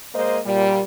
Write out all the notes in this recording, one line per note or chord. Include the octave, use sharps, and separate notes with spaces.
G#3 A#3 C5 D#5
A#2 G3